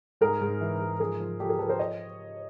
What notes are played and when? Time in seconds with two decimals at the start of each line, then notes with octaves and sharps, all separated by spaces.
0.21 G#2 G#4 A#4
0.41 G#2
0.61 E3
0.81 G#2
1.00 F3 G#4 A#4
1.20 F3
1.40 F3 G4 A4
1.49 G#4 A#4
1.59 F3 A4 B4
1.69 A#4 C5
1.79 C#5 D#5